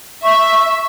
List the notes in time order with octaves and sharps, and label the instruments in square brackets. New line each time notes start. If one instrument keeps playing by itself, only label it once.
[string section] E5 [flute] C#6